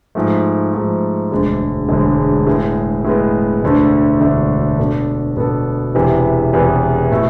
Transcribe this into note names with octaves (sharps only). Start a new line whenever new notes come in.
G#2 F3 A3
G#2 F3 A3
E1 D2 D3 G#3
E1 D2 D3 G#3
A2 G#3 B3
A2 G#3 B3
E1 D2 D3 A3 D4
E1 D2 D3 A3 D4
B2 B3 D4 A4
B2 B3 D4 A4
E1 E2 C3 E3 B3
E1 E2 C3 E3 B3
B2 A3 E4 A4